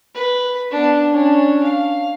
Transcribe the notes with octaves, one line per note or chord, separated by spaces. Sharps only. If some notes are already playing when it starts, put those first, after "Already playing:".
B4
B3 D4
C#4 D4
F5